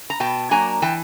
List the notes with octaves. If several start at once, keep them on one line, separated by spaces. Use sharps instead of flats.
A#5
B2 G5 A5
F#3 A#3 D4 G#5 A#5
E3 G5 A5